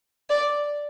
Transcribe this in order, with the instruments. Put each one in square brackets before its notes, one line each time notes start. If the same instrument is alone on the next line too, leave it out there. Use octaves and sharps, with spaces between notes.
[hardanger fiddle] D5